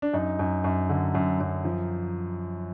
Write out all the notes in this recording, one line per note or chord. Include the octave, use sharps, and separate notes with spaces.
D4
F#2 D#4
F#2
F#2
D3
F#2
F#2
F3